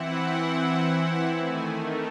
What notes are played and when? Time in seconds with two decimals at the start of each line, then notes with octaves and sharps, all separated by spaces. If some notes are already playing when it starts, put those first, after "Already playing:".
Already playing: E3 C4 E4 F#5
1.37 D#3 A3 G#5